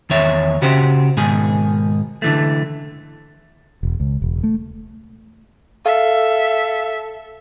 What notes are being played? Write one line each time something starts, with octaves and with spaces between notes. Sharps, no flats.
E2 D#3 C#5 E5
C#3 F#4 G4 C5
G#2 B2 D#3 G#4
D3 E3 A3
E1
C#2
E1
A3
A4 E5 F5